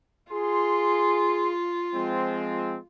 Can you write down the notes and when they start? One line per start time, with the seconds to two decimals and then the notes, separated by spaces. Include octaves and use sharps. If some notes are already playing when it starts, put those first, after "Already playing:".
0.32 F4 G#4 C6
1.94 F3 G#3 C4